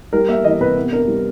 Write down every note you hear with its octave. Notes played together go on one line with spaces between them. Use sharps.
G3 A#4
A#3 E5
E3 D#5
C3 B4
B3
D4 A#4
G3